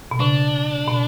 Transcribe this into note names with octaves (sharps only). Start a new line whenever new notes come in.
B2
C#3 D4
B2